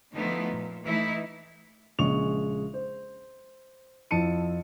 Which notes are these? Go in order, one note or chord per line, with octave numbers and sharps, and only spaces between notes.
D3 F3 A3 B3 D#4 E4
A#2
E3 A3 D#4 E4
A#1 C#3 G#3 C#6 F7
C5
F2 E4 A5 C#7 D#7